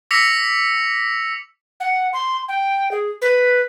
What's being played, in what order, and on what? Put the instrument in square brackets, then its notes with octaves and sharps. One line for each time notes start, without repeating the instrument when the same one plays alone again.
[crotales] D6 E6 A#6 B6 C#7 F7
[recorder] F#5
C6
G5
G#4
B4